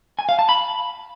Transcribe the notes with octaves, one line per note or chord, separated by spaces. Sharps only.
G#5
F5
A5
B5